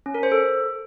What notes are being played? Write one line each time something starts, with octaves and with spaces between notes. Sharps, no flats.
C#4
A#4
C5
A4